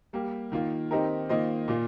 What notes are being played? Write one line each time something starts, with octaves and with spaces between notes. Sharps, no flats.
G3 A#3 G4
D#3 A#3 F4
D#3 C4 D#4 G4 A#4
D#3 A#3 F4 C5 D#5
A#2 A#3 F4